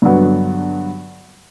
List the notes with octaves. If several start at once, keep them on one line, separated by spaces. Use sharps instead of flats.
G2 D3 F#3 B3